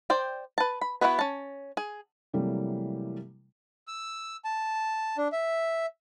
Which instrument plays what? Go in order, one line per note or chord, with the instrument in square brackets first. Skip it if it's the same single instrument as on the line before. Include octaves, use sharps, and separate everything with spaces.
[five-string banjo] C5 D5 G5
B4 A5
B5
B3 E4 F#4 G#4 B4
C#4 A5
G#4
[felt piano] C3 E3 F#3 G3 A3 A#3
[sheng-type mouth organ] E6
A5
D4
E5